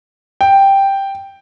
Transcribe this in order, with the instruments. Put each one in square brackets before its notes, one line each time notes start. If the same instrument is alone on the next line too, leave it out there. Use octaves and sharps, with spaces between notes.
[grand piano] G5